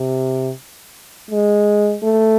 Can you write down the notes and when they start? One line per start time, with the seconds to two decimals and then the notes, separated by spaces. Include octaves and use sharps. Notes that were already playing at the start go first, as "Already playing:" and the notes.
Already playing: C3
1.30 G#3
2.03 A3